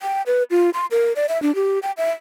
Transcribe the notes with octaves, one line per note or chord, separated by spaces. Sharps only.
G5
B4
F4
C6
A#4
D5
E5
D4
G4
G5
E5